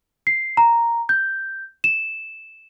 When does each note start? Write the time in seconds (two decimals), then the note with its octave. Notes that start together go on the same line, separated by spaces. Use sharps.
0.27 C7
0.57 A#5
1.09 G6
1.84 E7